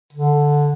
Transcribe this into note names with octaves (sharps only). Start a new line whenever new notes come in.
D3